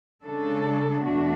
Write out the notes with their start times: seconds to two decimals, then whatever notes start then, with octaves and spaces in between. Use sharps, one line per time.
0.23 C#3 G#3 D4 A4
1.02 E2 B2 A3 D4 F#4